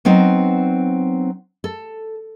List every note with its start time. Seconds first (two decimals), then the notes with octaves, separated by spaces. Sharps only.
0.05 F#3 B3 C4 D#4
1.64 A4